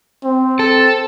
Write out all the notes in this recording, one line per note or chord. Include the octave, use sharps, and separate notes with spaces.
C4
A4